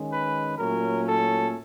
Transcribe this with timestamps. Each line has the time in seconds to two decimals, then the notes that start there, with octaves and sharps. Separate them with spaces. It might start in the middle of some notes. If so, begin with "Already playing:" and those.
Already playing: D#3 G#3 C#4
0.11 B4
0.58 A#2 F#3 A3 C#4 A#4
1.06 A4